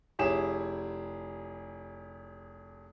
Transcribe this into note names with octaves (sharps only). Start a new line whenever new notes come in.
F1 E4 G4 G#4 C#5 E7